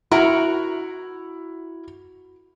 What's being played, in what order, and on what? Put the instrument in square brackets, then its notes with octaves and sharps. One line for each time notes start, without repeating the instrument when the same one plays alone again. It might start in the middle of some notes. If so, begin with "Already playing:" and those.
[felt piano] E4 [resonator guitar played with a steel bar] F#4 A#4